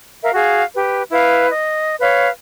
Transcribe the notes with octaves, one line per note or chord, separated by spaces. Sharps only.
A#4 E5 F5
F#4 G#4 F5
G4 B4
E4 B4 F5
D#5
B4 C#5 F5